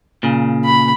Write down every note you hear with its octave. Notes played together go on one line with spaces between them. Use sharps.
A#2 C#3
B5